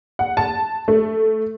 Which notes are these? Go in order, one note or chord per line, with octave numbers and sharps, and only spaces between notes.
F#5
A5
A3